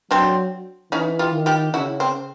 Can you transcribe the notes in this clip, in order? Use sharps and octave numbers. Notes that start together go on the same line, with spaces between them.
F#3 C4 D4
E3 C#4 D#4
F4 G4
D#3
F4 G4
C#3 E4 F#4
C4